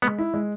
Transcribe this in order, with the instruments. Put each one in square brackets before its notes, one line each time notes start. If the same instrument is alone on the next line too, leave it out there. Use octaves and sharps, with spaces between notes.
[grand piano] G#3 [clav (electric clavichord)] B3
[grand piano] E4
G#3